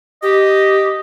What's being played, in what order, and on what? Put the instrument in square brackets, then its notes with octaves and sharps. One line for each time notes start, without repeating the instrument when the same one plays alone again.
[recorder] G4 [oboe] D#5